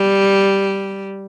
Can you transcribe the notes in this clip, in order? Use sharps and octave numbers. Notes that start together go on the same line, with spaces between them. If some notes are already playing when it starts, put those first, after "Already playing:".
Already playing: G3